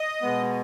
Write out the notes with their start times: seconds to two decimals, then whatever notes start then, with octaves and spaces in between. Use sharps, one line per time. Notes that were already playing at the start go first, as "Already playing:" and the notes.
Already playing: D#5 D#6
0.22 B2 G#3 B3